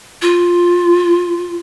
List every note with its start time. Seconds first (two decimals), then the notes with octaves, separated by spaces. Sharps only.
0.22 F4